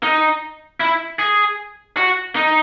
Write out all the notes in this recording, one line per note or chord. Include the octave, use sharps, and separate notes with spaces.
D#4
E4
G#4
F#4
D#4